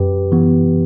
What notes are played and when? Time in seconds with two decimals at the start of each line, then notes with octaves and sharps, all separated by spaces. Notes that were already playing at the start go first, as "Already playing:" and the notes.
Already playing: F#2 G4 B4
0.32 E3 B3